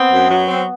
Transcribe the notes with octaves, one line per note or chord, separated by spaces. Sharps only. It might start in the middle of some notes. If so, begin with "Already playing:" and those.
Already playing: B3 C4
F#2
F#3
C4